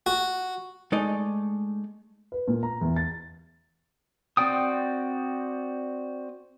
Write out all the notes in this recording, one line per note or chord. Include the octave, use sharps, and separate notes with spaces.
F#4
G#3 A3 D#4 D5 D#5
B4
A#2
A#5
E2
A6
C4 F#4 D5 G5 D#6